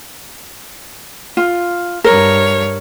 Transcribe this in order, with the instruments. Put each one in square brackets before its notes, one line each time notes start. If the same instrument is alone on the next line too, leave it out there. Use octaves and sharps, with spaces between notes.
[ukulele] F4
[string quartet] G2 C#5 [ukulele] A#4